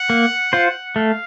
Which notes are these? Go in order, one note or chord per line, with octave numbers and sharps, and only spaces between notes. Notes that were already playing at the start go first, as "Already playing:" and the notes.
Already playing: F#5
A#3
F4 C5
A3 F5